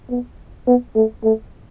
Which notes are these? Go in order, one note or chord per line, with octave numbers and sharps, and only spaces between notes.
B3
B3
A3
A3